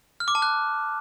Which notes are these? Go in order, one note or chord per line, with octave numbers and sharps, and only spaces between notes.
F6
D6
A5
F#6